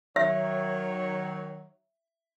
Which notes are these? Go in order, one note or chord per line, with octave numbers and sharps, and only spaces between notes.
D#3 F#3 C#5 E5